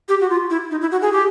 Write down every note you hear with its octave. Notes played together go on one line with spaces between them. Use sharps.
G4
F#4
F4
E4
D#4
E4
F#4
G#4
G4